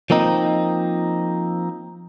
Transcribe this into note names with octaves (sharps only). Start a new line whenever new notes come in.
F3 A#3 C4 D#4